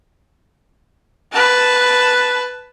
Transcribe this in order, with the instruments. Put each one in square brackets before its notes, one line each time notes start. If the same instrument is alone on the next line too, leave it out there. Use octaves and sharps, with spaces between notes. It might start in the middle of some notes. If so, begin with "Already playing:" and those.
[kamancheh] B4 A5